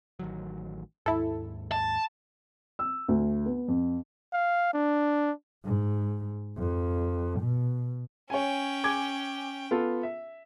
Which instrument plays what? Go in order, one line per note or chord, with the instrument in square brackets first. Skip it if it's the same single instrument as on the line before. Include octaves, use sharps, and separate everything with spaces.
[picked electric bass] A1 D#3 F#3
[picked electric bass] D#2 G#2 [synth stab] E4 A4
[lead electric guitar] A5
[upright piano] E6
D2
B3
F2
[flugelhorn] F5
D4
[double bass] G#2
F2
B2
[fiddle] C#4 G5 [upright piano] C#5 G#5
[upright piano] G#5 D6 G#6
B3 F4 A4
E5